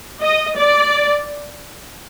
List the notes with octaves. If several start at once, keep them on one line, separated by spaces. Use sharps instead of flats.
D#5
D5